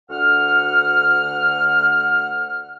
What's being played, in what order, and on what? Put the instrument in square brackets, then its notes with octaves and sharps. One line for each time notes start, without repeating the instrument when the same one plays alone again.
[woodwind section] D2 F#5 F6